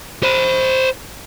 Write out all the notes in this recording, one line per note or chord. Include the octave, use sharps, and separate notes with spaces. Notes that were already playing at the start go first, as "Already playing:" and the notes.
C5 B5